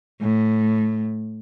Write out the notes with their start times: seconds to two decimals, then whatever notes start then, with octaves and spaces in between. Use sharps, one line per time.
0.21 A2